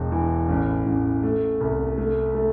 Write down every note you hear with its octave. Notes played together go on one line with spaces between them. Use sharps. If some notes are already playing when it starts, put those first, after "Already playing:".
Already playing: E1
E3
A1
A1
A3
C2
A3
A3